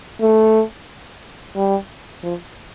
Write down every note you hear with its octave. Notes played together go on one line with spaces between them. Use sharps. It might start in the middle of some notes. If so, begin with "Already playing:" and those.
A3
G3
F3